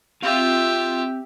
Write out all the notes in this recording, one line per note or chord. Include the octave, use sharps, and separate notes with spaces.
C4 F4 G4 E5 F5